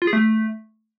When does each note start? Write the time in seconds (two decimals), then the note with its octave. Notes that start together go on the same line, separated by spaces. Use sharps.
0.02 F4
0.07 G#4
0.13 A3